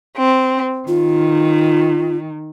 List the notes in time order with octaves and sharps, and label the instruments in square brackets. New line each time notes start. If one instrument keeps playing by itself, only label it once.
[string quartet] C4
[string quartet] D#3 [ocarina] F4